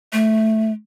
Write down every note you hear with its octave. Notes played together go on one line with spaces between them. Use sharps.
A3